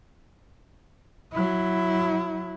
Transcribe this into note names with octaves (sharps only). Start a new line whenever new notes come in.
F#3 E4